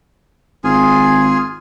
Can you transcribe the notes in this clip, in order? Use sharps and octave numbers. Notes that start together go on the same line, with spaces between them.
G#1 F4 G#4 G#5